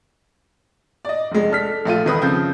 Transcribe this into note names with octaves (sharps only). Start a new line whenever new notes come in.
D5 D#5
F1 G#3
D4 A4 F6 B6
A#1 A3 F4 D#7
E1 D#3 B4 D#6
C#3 F3 C4 G6